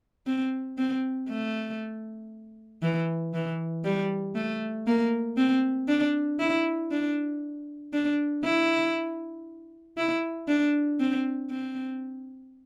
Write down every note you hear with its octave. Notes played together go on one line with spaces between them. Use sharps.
C4
C4
A3
E3
E3
G3
A3
A#3
C4
D4
E4
D4
D4
E4
E4
D4
C4
C4